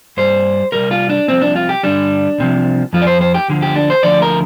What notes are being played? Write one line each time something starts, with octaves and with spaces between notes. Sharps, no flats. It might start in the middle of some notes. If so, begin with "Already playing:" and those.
G2 G3 C5
A#2 G3 A#4
C2
F4
D4
C2 C3 F3 C4
D4
F4
G4
G2 D3 G3 D4
C2 C3 F3
F2 F3 F4
D5
C5
C5
G4
D2 D3 F3
G4
D4
C5
D2 D3 F3 D5
A#4